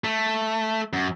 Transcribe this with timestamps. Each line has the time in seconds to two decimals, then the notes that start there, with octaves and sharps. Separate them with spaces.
0.04 A3
0.93 F#2